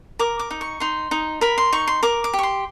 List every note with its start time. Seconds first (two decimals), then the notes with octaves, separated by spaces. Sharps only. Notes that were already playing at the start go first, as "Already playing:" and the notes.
0.19 A#4 D6
0.39 D6
0.51 D#4
0.61 C#6
0.80 D#4 C6
1.11 D#4
1.41 A#4 B5
1.58 C6
1.73 D#4 C#6
1.87 C6
2.03 A#4 D6
2.24 D6
2.33 G4
2.39 C#6
2.43 C6